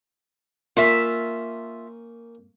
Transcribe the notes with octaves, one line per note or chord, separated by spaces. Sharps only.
A#3 C#4 D#4 F4 E5